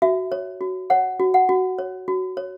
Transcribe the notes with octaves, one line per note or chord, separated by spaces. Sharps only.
F#4 E5
C#5
F#4
C#5 F#5
F#4
F#5
F#4
C#5
F#4
C#5